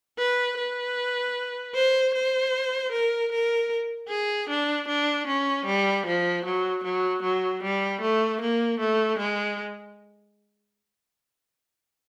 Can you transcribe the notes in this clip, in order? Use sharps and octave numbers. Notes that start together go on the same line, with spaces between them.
B4
B4
C5
C5
A#4
A#4
G#4
D4
D4
C#4
G3
F3
F#3
F#3
F#3
G3
A3
A#3
A3
G#3